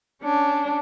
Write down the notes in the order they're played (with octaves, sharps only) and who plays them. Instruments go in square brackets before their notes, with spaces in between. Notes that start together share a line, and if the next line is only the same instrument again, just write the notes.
[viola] C#4 D4